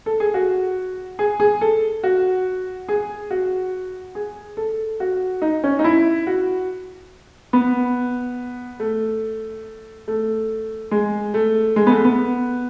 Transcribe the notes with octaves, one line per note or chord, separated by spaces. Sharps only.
A4
G#4
F#4
G#4
G#4
A4
F#4
G#4
F#4
G#4
A4
F#4
D#4
C#4
D#4
E4
F#4
B3
A3
A3
G#3
A3
G#3
B3
A3
B3